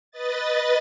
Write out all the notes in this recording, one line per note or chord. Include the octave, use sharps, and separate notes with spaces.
B4 D#5 A6